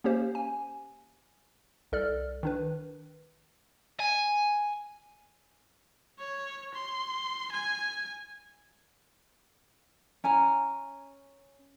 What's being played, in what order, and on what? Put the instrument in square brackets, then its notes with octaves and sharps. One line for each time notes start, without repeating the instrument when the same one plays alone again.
[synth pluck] A#3 C#4 G4 C5 F5
G#5
C2 A4 D5 F6
D#3 D4 B4
[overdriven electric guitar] G#5
[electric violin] C#5
C6
G#5
[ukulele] C#4 G#5 A#5